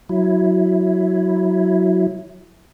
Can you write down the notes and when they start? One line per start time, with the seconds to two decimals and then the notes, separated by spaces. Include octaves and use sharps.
0.09 F#3 E4